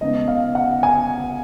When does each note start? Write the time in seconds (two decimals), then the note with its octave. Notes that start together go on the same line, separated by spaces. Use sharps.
0.01 C#3 G#3 B3 D#4 D#5
0.28 F5
0.55 F#5
0.83 G#5